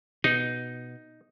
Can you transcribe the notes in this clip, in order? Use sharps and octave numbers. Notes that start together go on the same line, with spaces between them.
B2 D#4